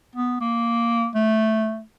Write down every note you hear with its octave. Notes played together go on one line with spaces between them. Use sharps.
B3
A#3
A3